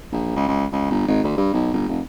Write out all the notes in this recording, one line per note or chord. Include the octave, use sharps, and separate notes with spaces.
A#1
C#2
C#2
C#2
G1
G#1
D2
G2
B1
G1
F1